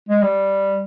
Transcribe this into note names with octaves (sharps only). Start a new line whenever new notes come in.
G#3
G3